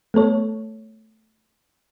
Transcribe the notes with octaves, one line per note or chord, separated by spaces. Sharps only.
A3 B3 A4 C#5